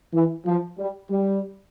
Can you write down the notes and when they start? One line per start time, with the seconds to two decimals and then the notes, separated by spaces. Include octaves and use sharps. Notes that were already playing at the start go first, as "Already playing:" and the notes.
0.14 E3
0.46 F3
0.78 G3
1.10 G3